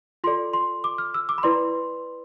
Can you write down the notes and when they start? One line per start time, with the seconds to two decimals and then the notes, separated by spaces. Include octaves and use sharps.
0.24 F4 A4 D5 C6
0.53 C6
0.84 D6
0.98 F6
1.14 E6
1.29 D6
1.38 B5
1.43 E4 B4 D5 C6